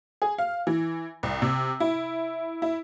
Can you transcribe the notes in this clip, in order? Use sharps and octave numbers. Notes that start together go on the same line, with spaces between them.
G#4
F5
E3
C2
C3
E4
E4